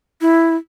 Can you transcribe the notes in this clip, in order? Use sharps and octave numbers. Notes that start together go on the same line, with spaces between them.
E4